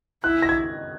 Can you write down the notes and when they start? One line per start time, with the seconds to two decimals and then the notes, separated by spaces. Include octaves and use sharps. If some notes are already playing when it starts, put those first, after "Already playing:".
0.24 E4 F#6
0.42 A#6
0.49 G#6